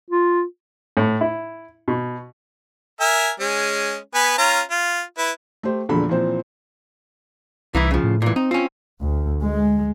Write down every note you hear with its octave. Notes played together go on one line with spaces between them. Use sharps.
F4
A2
E4
B2
A#4 E5 G#5
G#3 C#4
B3 B4 G#5
C#4 F4 A#5
F4
E4 B4
A3 G4 C5
E1 A#1 A#2 D3 A4 B5
A#2 E3 F3 C4 C5
C2 E3 D#4 E4
C#3 F3
A2
A#2 E3
C4 D#4
C4 C#4 F4
D2
G#3